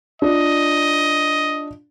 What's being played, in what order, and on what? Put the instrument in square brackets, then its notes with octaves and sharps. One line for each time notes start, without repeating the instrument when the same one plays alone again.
[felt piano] D4 F4 [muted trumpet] D#5